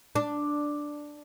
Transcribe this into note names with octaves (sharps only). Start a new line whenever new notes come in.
D4